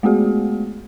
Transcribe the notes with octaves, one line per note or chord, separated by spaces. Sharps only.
G#3 A3 B3 F#4 G#4